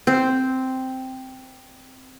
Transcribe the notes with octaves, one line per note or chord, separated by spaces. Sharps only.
C4